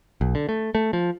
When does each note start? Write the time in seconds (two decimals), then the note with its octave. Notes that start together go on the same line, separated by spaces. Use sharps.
0.21 B1
0.35 D3
0.49 A3
0.75 A3
0.93 F3